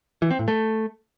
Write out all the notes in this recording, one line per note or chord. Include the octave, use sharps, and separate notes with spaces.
E3
C4
A2
A3